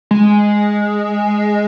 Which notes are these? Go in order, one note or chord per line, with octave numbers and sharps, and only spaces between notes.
G#3